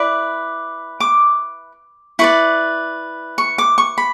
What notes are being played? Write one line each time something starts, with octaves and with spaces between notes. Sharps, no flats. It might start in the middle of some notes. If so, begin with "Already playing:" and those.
Already playing: E4 B4 D5
D6
E4 B4 D5 C#6
C#6
D6
C#6
B5